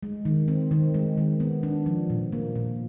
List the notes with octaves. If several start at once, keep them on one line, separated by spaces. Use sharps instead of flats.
G#3
D#3
C4
D#3
G#3
D#3
B3
D4
F3
A#2
A#3
A#2